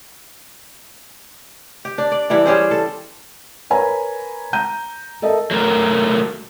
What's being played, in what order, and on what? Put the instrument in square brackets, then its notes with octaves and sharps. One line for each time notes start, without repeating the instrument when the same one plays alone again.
[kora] G4
D4
D5
E3 G3 D4 E4
G3 C#4 G#4 C5
A4
[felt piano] A#4 B4 C#5 G#5 A#5 B5
A#5 G6 D#7
A4 A#4 D#5 E5 A5
[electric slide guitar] F#3 A3 A#4